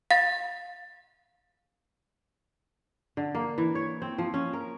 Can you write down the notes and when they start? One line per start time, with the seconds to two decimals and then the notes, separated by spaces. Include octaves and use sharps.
0.11 F5 A6
3.17 D3
3.35 A#3
3.58 E3
3.75 C#5
4.02 C4
4.18 F3
4.34 C#4
4.53 A#4